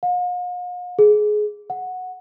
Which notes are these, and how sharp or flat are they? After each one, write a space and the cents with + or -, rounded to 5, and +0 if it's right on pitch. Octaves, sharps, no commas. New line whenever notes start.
F5 +45
G#4 +20
F#5 -10